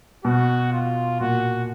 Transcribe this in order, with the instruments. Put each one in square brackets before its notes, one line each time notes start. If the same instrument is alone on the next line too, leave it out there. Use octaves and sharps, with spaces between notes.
[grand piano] B2 [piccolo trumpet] F#4
[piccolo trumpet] F4
[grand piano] A#2 [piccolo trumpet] F#4